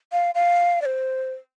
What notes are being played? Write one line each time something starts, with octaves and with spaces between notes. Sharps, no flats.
F5
F5
D5
C5